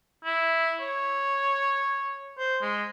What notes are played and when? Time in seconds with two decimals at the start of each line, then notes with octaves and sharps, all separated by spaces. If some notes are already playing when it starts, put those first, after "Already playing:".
0.25 E4
0.81 C#5
2.38 C5
2.62 G#3